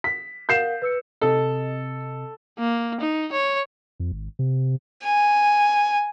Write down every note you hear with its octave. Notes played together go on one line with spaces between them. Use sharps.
B6
A#4 F5 F#5 G6 C7 E7
B4 E6 C#7
C3 A4 D#5
A#3
D#4
C#5
F2
G#1
C3
G#5